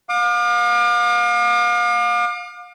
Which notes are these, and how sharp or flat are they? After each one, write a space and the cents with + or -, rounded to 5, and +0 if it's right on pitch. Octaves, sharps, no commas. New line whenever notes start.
F5 +35 D6 +40